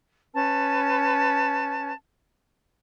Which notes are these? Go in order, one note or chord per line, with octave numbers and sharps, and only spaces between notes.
C#4 B4 A5